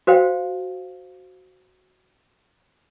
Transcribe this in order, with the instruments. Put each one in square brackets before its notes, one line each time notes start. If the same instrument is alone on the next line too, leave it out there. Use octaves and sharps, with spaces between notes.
[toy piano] F#4 C5 F5 G5